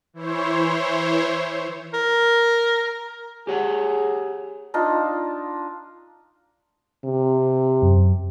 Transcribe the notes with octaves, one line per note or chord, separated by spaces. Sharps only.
E3 E4 C5 C#5
A#4
G4 G#4 C#5 F#5
D4 D#4 F4
C3
F#2